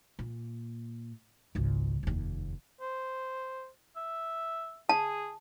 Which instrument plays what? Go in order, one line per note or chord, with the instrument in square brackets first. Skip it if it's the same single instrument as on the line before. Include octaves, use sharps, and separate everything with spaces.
[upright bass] A#2
G#1 C#2
F1 D#2
[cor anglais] C5
E5
[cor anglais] G#4 [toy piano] A5